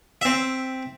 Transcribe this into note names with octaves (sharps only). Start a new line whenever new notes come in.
C4 E5